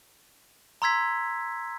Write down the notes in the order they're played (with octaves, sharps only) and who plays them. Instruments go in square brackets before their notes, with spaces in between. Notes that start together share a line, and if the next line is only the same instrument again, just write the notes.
[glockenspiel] A#5 C6 E6 G#6 B6